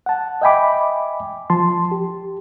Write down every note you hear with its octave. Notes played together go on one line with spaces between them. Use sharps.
F#5 A5
D#5 E5 G5 G#5 B5 D6
F3 A5 C6
G4